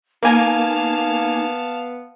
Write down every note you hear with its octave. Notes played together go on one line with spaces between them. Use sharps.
A#3 B3 D#4 F5 G#5 A5